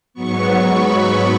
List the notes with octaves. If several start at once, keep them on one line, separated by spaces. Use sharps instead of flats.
G#2 F#3 B3 C#6
B5